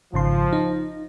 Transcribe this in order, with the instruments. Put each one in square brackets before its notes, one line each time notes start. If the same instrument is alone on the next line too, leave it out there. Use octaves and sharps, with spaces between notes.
[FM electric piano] G#1 C#3 C6 [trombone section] F3
[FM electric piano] D#4